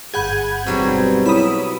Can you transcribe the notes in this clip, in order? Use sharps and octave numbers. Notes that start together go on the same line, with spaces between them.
G1 G#4 F#5 B5 G6 G#6
B1 G2 B2 F#3 G3 C4
E4 C#5 B5 D#6